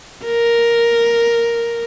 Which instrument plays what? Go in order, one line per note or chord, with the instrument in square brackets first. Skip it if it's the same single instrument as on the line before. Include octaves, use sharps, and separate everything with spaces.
[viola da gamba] A#4